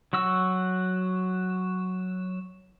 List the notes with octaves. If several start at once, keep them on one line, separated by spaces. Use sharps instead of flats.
F#3 F#4 E6